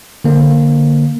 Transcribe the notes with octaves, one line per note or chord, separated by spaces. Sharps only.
D3 A#3